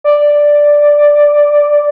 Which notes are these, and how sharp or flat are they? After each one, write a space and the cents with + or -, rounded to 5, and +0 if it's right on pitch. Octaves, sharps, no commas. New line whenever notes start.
D5 +0